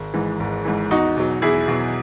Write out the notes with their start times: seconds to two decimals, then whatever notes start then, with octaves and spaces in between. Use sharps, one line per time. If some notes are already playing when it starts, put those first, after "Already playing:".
Already playing: G#1
0.14 G#2 E3
0.40 G#1
0.65 G#2 E3
0.91 E2 D#4 F#4
1.17 B2 F#3
1.42 E2 E4 G#4
1.68 B2 F#3